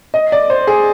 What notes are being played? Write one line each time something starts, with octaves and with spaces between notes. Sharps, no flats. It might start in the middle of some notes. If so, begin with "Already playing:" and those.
D#5
D5
C5
G#4